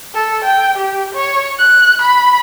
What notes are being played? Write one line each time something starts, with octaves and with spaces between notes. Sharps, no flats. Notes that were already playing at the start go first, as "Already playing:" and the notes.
A4
G5
G4
C#5
F#6
B5